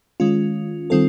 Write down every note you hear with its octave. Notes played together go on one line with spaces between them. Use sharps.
D#3 G#3 C#4 F4
D#3 G3 C4 F4 A4